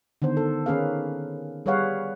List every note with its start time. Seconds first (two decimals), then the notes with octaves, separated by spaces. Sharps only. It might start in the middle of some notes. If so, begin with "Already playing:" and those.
0.22 D3 D#3 B3 C5
0.37 A4
0.66 D#3 A#3 C#4 G#4 B4 F5
1.66 G3 G#4 B4 C#5 F5 F#5